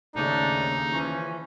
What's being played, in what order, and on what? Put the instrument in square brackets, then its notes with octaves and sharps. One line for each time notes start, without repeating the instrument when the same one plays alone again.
[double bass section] D#2 C#3 [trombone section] G#2 A3 D4 [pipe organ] D#4
[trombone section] E3 F3 C#4